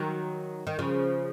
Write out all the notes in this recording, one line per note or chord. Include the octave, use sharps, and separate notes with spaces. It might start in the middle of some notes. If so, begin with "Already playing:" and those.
Already playing: D#3 F#3
D#3
C#3 F3